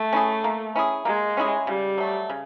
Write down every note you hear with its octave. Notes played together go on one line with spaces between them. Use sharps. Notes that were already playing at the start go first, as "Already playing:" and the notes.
Already playing: A3
C#4 E4 G#4
A#3
C#4 E4 G#4
G#3 A#3
C#4 E4 G#4
C#3 G3
F#3 A3
C#3